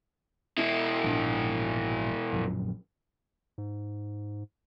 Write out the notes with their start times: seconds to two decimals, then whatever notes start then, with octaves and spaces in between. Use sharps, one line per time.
0.58 B2 E4
1.04 A#1 G#2 D4
2.32 A#1 F#2 A#2
3.58 G#2